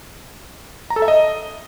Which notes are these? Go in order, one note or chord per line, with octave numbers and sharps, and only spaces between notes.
A#5
A4
E5
D#5